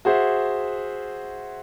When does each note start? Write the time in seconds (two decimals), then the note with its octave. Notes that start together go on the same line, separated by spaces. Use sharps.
0.05 F#4 G#4 C5 E5